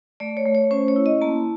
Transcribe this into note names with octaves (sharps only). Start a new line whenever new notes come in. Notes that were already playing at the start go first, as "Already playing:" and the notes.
A3 D5
C#5
A3
C#5
C#4 C5
C#5
E4
D#5
A#3 A5